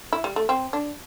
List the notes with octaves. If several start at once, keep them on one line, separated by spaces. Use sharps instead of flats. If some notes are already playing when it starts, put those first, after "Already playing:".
E4
G3
A3
C4
D4